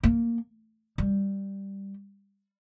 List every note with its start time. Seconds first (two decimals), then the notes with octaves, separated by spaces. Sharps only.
0.03 A#3
0.98 G3